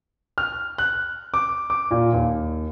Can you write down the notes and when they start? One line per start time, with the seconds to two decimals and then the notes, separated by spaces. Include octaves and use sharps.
0.38 F6
0.78 F#6
1.34 D6
1.70 D6
1.91 A#2
2.13 D#2